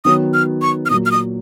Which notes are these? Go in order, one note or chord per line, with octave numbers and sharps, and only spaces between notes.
D#3 F#3 B3 F#4 C#5 D#6
F6
C#6
F6
A#2 F#3 A#3 D#6
F6
D#6